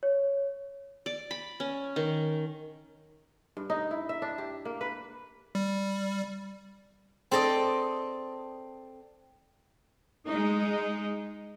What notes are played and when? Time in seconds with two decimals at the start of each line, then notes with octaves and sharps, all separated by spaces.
0.03 C#5
1.06 D5
1.31 B5
1.60 C#4
1.96 D#3
3.57 G2
3.70 D#4
3.91 E4
4.09 E5
4.22 D4
4.38 G4
4.65 A#3
4.81 B4
5.55 G3
7.31 C4 A4 D5 D#5
10.26 G#3 D#4